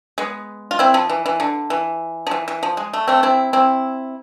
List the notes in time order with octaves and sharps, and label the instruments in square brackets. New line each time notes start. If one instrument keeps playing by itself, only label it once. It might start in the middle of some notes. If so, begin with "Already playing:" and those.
[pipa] G#3 B3
F4
C4 E4
F3
E3
E3
D3
E3
F3
E3
E3
F3
G#3
A3
A3 C4
C4 E4
C4 E4